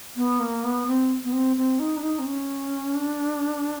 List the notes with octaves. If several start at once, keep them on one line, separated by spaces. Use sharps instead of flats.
B3
A#3
B3
C4
B3
C4
C4
D#4
D4
D#4
C4
C#4
D4